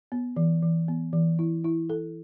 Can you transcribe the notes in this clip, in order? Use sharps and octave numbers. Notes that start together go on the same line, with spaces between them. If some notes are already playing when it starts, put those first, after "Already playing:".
B3
E3
E3
B3
E3
E4
E4
A4